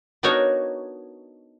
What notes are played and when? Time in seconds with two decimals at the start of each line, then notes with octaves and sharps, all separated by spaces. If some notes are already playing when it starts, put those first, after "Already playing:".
0.23 B3 D4 D#4 F#4 A#4 C#5